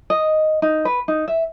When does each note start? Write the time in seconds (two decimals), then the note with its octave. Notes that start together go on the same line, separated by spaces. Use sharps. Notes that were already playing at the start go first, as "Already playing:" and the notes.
0.10 D#5
0.62 D#4
0.85 B4
1.08 D#4
1.28 E5